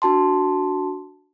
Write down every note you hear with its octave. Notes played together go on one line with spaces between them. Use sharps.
D4 F#4 A5 C6